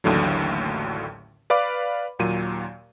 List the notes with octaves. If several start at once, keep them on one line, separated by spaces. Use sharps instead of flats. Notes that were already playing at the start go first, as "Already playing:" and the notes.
A1 D#2 A2 D3 F#3
B4 D5 F5 B5 D6
D#2 A#2 F#3 D#7